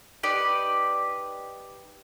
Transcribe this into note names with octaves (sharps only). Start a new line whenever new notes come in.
D#4 G4 B4 D5